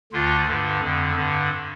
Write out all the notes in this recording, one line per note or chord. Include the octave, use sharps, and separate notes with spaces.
D2 D3 F4
G2 D3
F2 D3
G2 D3